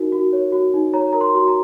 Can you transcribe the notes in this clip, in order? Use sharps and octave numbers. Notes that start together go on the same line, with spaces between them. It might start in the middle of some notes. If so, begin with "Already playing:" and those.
Already playing: D#4 F#4 A#4
F#4
C#5
F#4
D#4
C#5 A#5
A#4 A#5
C6
F#4 C6
A#5